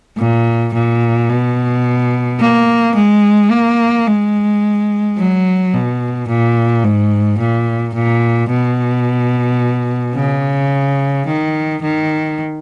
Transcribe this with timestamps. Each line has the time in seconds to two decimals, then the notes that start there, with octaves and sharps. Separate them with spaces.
0.18 A#2
0.74 A#2
1.29 B2
2.40 A#3
2.95 G#3
3.51 A#3
4.06 G#3
5.17 F#3
5.73 B2
6.28 A#2
6.84 G#2
7.39 A#2
7.95 A#2
8.50 B2
10.16 C#3
11.28 D#3
11.83 D#3